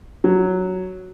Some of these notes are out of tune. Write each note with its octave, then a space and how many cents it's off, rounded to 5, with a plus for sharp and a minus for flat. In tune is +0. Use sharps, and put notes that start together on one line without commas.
F#3 +0